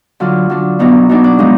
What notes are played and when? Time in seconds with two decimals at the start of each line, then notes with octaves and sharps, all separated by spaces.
0.20 D3 F#3 D4 F4
0.49 D3 F#3 D4
0.79 B2 F#3 B3 D4 D#4
1.09 B2 F#3 B3 D4 D#4
1.24 D4
1.39 F3 G#3 B3 D#4